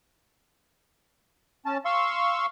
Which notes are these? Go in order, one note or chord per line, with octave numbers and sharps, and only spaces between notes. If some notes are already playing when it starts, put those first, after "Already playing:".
C#4 A5
F5 C6 C#6 E6